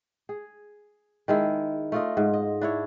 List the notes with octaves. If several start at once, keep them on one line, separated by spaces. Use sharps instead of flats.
G#4
D#3 G#3 E4
A3 F4 D#5
G#2
D#5
D4 E4 C#5